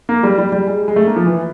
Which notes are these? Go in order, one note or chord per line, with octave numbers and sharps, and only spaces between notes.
A#3
G3
G3
G3
G#3
G#3
A3
A#3
F3
E3